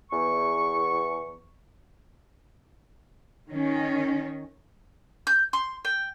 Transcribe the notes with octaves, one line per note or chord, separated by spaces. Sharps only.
E2 C#6
D#3 C#4
G6
C6
G5